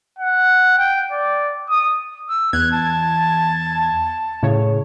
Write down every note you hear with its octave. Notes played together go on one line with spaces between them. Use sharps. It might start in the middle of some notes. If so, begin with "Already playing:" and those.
F#5
G5
D5
D#6
E6
E2 F#6 G#6
A5
A2 C#3 C#5